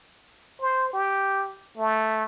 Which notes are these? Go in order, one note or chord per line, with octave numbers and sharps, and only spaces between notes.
C5
G4
A3